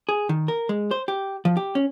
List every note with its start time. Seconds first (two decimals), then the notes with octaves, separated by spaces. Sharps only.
0.09 G#4
0.29 D#3
0.48 A#4
0.69 G#3
0.91 C5
1.08 G4
1.45 F3
1.57 G4
1.75 C#4